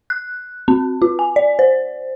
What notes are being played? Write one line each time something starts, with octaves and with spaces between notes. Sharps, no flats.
F#6
C4
F4
G#5
D5
C5